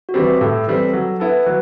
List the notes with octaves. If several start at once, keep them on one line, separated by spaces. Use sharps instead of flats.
F#4
E3 G3 C4 G4
A2 A4
E3 G3 C4
F#3
B3 E4 A4
F#3 B4